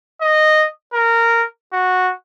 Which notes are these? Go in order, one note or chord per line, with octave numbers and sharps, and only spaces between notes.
D#5
A#4
F#4